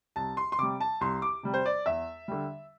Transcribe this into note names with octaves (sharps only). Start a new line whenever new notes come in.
C2 A5
C6
C6
C3 G3 D6
A5
C2 C6
D6
C3 G3
C5
D5
E2 E5
D3 G3